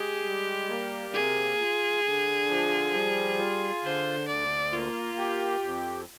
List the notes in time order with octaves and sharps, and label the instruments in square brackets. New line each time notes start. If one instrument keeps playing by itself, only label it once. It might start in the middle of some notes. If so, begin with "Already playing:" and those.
Already playing: [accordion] G#3 G#4 [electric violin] G4
[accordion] G3
A#3
[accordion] C3 [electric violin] G#4
[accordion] F4
D3
F3
G3
F4
[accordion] D3 [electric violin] C5
[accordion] D2 [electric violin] D5
[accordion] A#3 [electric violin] F4
[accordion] G4
F2